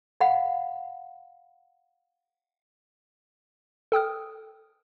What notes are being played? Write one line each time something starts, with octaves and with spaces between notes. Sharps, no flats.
F5 F#5 B5
A4 G5 D#6 F6